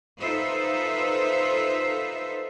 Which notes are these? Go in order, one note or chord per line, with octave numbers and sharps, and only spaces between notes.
D#4 F4 A4 B4 C5 E5